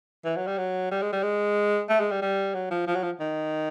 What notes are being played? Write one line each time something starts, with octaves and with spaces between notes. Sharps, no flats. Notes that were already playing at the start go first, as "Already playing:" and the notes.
E3
F#3
G3
F#3
G3
G#3
G3
G#3
A3
G#3
G3
G3
F#3
F3
F3
F#3
F3
D#3